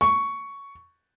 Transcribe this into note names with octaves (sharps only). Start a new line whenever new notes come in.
C#6